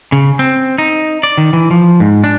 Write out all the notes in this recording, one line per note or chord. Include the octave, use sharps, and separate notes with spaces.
C#3
C4
D#4
D5
D#3
E3
F3
G#2
D4